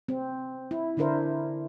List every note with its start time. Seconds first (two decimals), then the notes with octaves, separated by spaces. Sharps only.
0.08 C4
0.71 E4
0.97 D3 D4 E4 A#4 C5